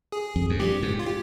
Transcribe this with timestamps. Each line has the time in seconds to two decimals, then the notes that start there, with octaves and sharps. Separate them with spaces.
0.12 G#4
0.36 F2
0.50 F2
0.59 G2 G4
0.83 G#2
0.99 F4
1.06 G4